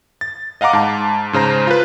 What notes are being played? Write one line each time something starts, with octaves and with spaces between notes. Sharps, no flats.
A6
D#5 F5 F#5 A#5 D6
G#2 A5
G#2 C#3 C5 A#5
F4 B4